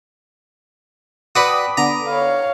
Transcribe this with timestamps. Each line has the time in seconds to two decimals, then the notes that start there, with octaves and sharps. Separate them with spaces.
1.36 F#4 B4 D5 G5 A5 B5 D6 D#6
1.77 D3 B3 A#5
2.07 C#5 F5